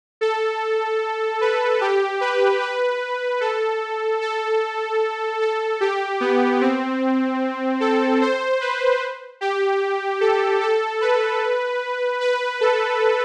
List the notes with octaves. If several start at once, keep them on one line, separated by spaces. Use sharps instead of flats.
A4
B4
G4
B4
B4
A4
A4
A4
G4
B3
C4
A4
C5
B4
G4
A4
A4
B4
B4
A4